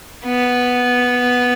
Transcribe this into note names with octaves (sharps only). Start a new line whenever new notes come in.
B3